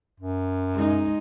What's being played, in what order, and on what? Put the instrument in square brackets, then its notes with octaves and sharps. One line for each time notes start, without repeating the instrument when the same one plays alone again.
[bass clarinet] F#2
[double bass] G#3 D#4